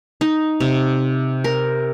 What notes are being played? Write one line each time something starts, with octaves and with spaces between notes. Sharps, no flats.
D#4
C3
A#4